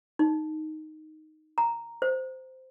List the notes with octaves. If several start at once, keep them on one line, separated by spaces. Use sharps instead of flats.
D#4
A#5
C5